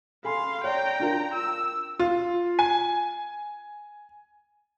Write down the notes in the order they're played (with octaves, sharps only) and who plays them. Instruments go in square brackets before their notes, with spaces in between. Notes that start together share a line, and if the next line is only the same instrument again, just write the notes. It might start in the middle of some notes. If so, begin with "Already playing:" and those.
[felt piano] A4 G#5 B5 [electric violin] F5 C6
[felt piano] C#5 D5 [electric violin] G5 A#5
[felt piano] D4 F4 A#4
[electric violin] E6
[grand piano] F4
G#5